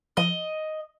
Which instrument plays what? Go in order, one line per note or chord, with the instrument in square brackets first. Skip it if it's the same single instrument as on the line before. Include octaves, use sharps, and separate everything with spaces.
[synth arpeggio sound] F3 [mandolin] D#5